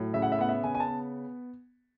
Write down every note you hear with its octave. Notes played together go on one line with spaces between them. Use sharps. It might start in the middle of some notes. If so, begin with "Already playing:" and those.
Already playing: A2 F#3
C#3 E5
F#5
E5
B3 F#5
E5
C#3 G#5
G#5
A5
B3